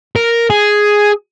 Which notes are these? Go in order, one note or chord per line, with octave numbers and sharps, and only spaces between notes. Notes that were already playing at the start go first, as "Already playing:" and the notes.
A#4
G#4